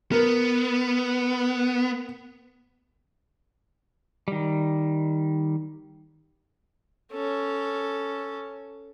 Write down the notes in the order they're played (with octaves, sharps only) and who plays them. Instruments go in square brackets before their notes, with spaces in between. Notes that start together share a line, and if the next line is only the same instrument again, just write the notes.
[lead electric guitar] B3 [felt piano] A#4
[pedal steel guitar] D#3 G3
[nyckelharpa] C#4 A4